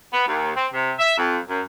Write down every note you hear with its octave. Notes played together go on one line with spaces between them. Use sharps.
B3
D#2
C4
C3
E5
F2
F#2